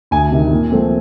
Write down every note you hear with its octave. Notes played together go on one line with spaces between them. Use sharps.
D2 G#5
C3 D#3
A#2
F3 A3 C4